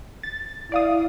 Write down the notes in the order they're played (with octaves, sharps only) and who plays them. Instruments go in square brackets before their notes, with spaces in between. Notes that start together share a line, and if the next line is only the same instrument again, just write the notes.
[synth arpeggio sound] A6
[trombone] E4 [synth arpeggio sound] D5 F5 D#6